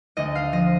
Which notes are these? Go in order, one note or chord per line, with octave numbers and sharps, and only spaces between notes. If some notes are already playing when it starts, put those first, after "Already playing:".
D2 D#5
F5
F3 D#5